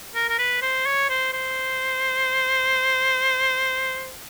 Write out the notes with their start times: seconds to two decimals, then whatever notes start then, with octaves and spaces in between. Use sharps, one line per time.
0.15 A#4
0.29 A#4
0.39 B4
0.62 C5
0.86 C#5
1.09 C5
1.33 C5